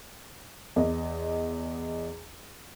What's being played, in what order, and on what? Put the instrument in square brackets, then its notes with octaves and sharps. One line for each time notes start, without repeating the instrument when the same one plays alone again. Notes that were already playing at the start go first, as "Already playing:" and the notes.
[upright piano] E2 D#5